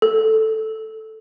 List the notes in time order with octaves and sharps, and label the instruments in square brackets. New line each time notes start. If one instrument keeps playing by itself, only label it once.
[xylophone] A4